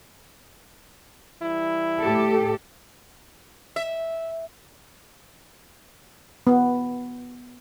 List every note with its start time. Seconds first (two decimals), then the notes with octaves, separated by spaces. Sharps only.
1.42 E3 G3 E4
2.01 A2 G4 A4
3.76 E5
6.47 B3